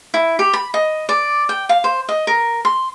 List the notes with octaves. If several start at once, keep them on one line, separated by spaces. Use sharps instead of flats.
E4
G4
B5
D#5
D5
G5
F5
C5
D#5
A#4
C6